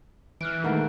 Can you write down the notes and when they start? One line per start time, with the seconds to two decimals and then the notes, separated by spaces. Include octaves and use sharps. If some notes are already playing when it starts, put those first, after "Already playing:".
0.41 E3 F6 F#6 D7
0.64 D#3 G#3 A3 A#4 F#5 A#5